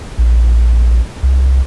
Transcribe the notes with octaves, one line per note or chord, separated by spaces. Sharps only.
A#1
C2